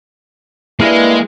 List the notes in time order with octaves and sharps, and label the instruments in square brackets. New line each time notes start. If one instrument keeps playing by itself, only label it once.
[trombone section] G2 [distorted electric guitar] G#3 [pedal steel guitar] A#3 F5 G#5 [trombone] E4